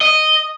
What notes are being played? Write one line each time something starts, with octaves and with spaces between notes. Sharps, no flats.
D#5